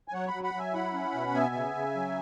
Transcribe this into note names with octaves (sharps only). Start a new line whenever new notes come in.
G#5
F#3 C#5 F#5
F#5 B5
F#3
F#5 B5
F#3 E5 G#5
E4 F#5 B5
C#4
B2
B3 E5 G#5
C#3
C#3
F#3